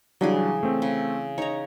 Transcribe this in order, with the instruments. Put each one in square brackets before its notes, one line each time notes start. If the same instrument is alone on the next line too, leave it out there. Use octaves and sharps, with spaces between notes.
[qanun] C#3 E3 G#4 [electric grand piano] F#3 G3 D4
[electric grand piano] A3 C4
[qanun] C#3
[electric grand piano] D#4 [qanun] C#5 A#5